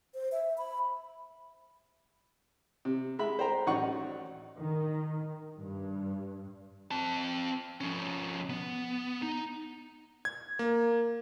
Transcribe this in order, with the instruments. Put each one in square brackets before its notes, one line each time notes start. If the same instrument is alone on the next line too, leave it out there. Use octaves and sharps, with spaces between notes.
[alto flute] C5
E5
B5
[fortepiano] C3
G#3 E5 B5
C5 G5 A#5
A1 F#3 D#4 D5 F#5 C#6
[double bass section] D#3
G2
[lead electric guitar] C4 A5
F3 C#4
B3
D#4
[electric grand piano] G#6
A#3